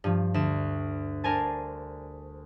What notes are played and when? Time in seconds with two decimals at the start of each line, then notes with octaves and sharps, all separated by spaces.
0.04 G2 F3
0.34 D2 E7
1.24 D4 A#4 C5 G#5 A5